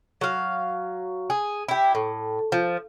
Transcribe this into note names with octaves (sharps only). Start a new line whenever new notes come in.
F#3 F5
G#4
E4 G4
A2
F3